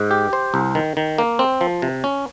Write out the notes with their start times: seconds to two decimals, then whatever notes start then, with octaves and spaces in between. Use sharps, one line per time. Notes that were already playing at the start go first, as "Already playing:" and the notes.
Already playing: G#2
0.11 G4
0.33 C5
0.54 C2
0.75 D#3
0.97 D#3
1.18 A#3
1.39 C4
1.61 F3
1.82 C3
2.04 C#4